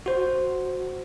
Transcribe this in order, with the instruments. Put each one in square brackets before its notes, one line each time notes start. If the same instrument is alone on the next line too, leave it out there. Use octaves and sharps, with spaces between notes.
[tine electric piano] F#4 C5